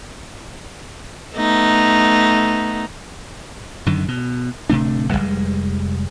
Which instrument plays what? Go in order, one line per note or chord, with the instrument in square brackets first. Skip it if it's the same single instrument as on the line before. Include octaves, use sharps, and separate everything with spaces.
[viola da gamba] A3 B3 D#4
[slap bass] F#2 D3 D#3
B2
D1 C3 A3 D4
F1 D#2 G3 G#3